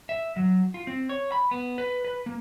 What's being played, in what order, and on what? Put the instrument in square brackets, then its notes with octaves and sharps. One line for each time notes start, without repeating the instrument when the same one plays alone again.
[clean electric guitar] E5
F#3
F4
C4
C#5
B5
B3
B4
B4
A#3